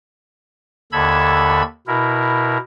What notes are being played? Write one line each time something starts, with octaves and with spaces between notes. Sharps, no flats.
D#2 D3 A4 B5 E6 G#6
B2 E4 A#4